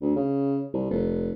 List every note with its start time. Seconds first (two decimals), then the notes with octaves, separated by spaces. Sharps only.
0.01 D2
0.16 C#3
0.74 C2
0.90 F1